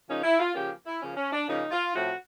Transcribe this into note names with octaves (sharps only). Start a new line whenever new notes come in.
C#3 F3 A#3 C#4 D#4
E4
F4
C#3 F3 A#3 C#4 G4
E4
C#3 F3 A#3 C#4
C#4
D4
C#3 F3 A#3 C#4 D#4
F4
A2 F3 A3 C4 F#4